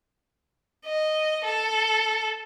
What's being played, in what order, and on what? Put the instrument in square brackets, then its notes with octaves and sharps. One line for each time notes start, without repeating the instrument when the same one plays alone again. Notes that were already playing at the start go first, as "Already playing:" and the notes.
[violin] D#5
A4